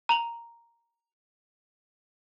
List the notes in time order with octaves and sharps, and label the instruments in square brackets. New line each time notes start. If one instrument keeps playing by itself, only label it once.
[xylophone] A#5 F7 F#7